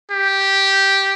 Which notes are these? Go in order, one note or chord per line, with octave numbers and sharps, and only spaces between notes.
G4